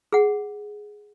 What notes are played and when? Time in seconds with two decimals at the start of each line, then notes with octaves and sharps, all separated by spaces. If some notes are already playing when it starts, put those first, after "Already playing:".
0.13 G#4 F#5